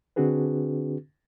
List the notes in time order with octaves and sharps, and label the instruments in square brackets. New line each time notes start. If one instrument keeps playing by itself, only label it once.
[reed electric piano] D3 C4 D4 F#4 G#4 B4